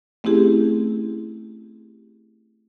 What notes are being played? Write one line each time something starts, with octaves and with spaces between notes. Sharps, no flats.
A3 C4 C#4 E4 G4 G#4